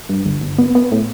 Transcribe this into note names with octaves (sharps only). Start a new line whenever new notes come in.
G2
G1
G1
B3
B3
A2